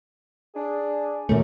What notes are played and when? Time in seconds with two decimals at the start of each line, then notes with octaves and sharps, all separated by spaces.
0.54 D4 G#4
1.29 F#2 A#2 D#3 A3